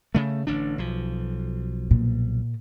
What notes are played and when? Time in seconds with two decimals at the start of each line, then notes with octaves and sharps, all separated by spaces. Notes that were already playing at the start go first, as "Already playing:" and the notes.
0.15 C#3 A3
0.47 A1 D3 D4
0.78 B1 F3
1.91 A#2